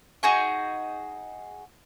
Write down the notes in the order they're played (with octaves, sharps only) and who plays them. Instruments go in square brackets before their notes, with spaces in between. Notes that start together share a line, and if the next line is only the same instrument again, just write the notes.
[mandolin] D#4 F#4 G#4 C#6